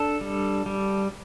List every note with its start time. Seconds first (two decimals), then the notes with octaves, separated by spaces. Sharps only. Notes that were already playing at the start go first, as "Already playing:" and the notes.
Already playing: D4 A4
0.21 G3
0.66 G3